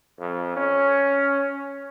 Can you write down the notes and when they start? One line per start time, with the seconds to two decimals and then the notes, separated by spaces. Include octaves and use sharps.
0.19 F2
0.56 C#4